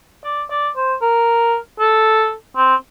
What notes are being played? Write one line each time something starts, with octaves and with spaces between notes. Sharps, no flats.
D5
D5
C5
A#4
A4
C4